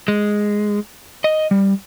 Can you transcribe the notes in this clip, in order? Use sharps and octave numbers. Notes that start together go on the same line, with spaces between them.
G#3
D#5
G3